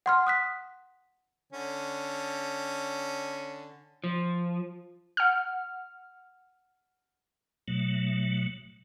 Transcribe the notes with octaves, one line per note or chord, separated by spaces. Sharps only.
F#5 C6 F6
D#6 F#6 B6
D3 C#4
F3
F#5 F6
B2 F#3 A3